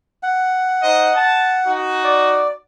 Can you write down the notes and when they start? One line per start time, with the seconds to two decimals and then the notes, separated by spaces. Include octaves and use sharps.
0.23 F#5
0.83 D#4 C5 D#5
1.16 A5
1.67 D#4 F#4
2.04 D5